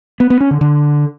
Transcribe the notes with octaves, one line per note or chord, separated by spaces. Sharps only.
B3
B3
C#4
D3
D3